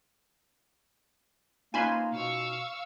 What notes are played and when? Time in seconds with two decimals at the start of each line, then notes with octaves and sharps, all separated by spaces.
1.74 A#3 C#4 D#4 F4 B4 C5 G#5
2.13 B2 F5 C#6 E6